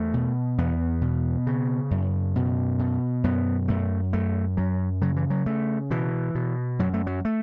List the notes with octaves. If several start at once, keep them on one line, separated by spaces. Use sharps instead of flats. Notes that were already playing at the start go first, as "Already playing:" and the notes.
Already playing: E2 A3
B2
E2 B3
B2
C#3
F#2
B2
B2
F#2 B3
F#2 A3
F#2 A3
F#2 F#3
C#3 F#3
E3
F#3
C#3 A3
B2 E3
B2
F#2 F#3
A3
F#3
A3